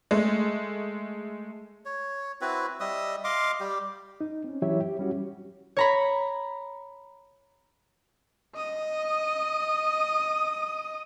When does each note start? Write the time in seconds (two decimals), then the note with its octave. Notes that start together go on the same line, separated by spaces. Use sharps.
0.11 G#3 A3
1.85 C#5
2.41 C4 E4 F#4 B4
2.80 G3 D#5 E5 D#6
3.24 D#5 F5 C6 D6
3.60 G3 G4
4.21 D#4
4.44 C4 C#4
4.62 E3 F#3 E4 G4 C#5 E5
4.80 G4
4.99 G3 C#4 F#4 G4
5.77 C#5 A#5 B5
8.55 D#5 D#6